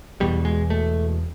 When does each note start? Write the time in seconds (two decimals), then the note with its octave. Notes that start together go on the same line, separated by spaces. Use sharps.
0.20 E1 E2 B2 G3
0.45 G#3
0.70 A3